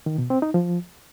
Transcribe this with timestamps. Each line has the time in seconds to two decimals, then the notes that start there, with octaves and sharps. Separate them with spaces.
0.06 D#3
0.18 B2
0.30 C4
0.42 D#4
0.54 F3